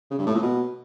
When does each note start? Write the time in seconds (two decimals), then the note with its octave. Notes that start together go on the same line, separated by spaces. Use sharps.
0.11 C#3
0.19 G2
0.26 A2
0.34 A#2
0.42 B2